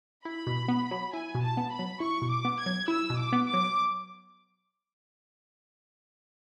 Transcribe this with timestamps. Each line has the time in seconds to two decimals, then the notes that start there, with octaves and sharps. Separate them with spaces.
0.25 E4 B5
0.47 B2
0.68 B3
0.91 F#3
1.13 E4 G#5
1.35 B2
1.42 A5
1.57 B3
1.71 B5
1.79 F#3
2.00 E4 C#6
2.22 B2
2.30 D6
2.45 B3
2.59 G#6
2.66 F#3
2.88 E4 E6
3.10 B2
3.17 D6
3.33 B3
3.46 D6
3.54 F#3